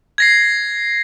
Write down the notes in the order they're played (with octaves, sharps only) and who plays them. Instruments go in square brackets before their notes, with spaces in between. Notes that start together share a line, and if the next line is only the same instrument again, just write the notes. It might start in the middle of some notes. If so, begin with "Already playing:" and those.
[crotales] G#6 A#6 C7